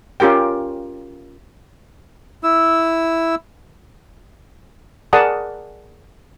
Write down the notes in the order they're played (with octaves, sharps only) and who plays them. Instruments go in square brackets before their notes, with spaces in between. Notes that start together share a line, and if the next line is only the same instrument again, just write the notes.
[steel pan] C#4 F4 G4 A#4 G5
[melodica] E4 E6
[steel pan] G#4 A#4 D5 F#5 A5 D#6